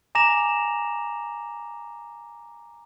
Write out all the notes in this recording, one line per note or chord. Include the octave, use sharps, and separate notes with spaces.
G#5 A#5 D6 A#6 E7 F7